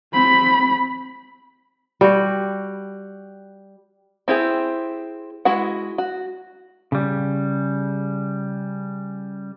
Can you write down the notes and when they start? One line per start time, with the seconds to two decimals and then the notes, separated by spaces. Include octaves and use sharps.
0.13 C4 B5
2.01 G3 F#4
4.28 C4 E4 G4 G#4
5.45 G#3 E4 F#4 F#5
5.98 F#4
6.92 C#3 G3